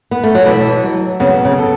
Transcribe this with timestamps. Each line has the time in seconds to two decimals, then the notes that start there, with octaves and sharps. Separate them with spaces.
0.11 B3
0.23 A3
0.35 F#3
0.46 B2 E3 A4
0.84 F#3
1.20 C#3 B3
1.45 C#3
1.58 A4